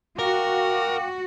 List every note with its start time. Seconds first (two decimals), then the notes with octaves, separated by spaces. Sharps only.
0.19 F#4 A#4 F5 G5 D6